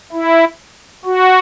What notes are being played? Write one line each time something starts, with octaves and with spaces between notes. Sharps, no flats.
E4
F#4